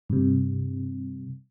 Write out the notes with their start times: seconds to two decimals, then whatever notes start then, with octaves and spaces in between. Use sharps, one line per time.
0.10 G2 C3